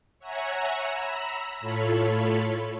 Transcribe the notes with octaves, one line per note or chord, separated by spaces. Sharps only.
C#5 E5 F#5 G#5 A#5
A#5 B5 E6
A2 F4 A4 C#5 B5